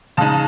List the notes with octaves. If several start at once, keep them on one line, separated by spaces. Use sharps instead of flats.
C#3 G#3 D#4 A5